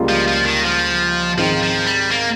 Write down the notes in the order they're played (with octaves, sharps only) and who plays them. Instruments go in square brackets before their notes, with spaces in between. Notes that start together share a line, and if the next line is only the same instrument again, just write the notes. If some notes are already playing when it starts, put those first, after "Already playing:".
Already playing: [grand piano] C#2 C#3 G3 A#3 F4
[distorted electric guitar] F3
F3
D#3
F3
[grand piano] G#2 D#3 G#3 C4 D#4 [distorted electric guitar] F3
[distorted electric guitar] F3
G3
A#3